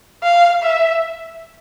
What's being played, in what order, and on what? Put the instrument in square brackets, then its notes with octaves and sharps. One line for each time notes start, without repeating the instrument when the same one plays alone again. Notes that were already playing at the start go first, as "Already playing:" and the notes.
[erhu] F5
E5